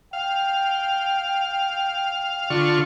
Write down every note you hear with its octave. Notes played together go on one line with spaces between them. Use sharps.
F5 G5
D3 F4 C#6